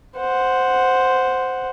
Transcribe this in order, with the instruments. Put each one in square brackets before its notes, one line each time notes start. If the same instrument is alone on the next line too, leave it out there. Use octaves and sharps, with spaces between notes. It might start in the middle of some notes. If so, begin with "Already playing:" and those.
[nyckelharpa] C5 F#5